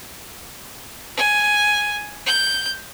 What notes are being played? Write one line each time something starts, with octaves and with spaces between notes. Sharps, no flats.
G#5
G6